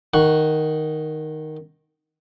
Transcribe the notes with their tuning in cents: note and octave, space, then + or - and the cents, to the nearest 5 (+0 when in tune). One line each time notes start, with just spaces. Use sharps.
D#3 +0 F#5 +0 C#6 +0